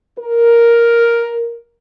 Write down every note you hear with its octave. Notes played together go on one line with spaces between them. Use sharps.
A#4